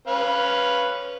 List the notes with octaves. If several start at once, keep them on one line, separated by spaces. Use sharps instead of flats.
C#4 B4 F5